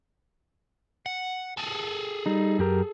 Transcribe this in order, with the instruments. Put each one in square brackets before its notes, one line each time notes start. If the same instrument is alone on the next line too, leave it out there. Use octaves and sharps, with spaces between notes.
[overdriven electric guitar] F#5
G#4 A4
[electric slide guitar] G3 D#4
F#2 G4 A#4